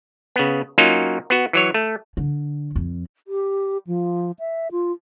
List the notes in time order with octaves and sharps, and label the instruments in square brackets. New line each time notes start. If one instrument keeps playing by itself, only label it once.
[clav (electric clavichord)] C#3 B3
F#3 A#3 C#4 D#4 F4 F#4
B3 F#4
E3 F#3 C#5
A3
[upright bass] D3
F2
[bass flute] G4
F3
E5
F4